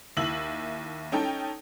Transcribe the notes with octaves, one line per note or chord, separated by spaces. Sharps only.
D#2 E4 E6 F#7
C#4 D#4 A4 G5